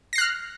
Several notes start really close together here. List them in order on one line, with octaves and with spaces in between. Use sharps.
A#6 C7 F#6 F6